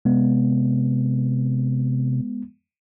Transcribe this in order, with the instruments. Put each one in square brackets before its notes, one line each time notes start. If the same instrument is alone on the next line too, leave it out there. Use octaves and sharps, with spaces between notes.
[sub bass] C3 [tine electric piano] G#3 B3